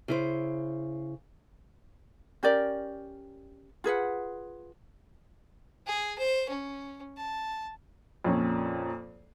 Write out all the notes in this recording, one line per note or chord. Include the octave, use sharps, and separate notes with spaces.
C#3 E4 C5
C#4 G4 A#4 D5
F4 G#4 B4 F#5
G#4
C5
C#4
A5
F2 A#2 C#4